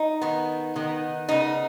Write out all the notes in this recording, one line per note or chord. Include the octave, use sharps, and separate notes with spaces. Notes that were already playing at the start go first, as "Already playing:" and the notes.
Already playing: D#4
D#3 B3
D#3 B3
C#3 B3 D#4